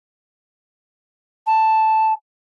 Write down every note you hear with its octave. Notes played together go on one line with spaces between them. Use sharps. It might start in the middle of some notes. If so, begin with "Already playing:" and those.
A5